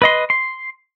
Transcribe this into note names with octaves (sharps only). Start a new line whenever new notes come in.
B4 D#5 C6
C6